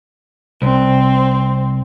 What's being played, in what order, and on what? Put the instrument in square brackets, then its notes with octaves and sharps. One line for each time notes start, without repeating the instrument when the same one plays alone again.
[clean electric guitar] C2 [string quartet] C4